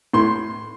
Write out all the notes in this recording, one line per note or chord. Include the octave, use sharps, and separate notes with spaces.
A2 C6